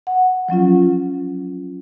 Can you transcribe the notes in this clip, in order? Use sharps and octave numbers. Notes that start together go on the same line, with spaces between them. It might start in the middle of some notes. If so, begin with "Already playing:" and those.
F#5
F3 F#3 C#4 F4